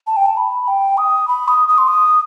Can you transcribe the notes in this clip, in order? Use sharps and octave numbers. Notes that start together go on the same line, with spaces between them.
A5
G5
A5
B5
G5
D#6
B5
D#6
D#6
C6
D#6